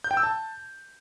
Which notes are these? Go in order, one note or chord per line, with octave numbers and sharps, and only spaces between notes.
G6
G5
E6
A5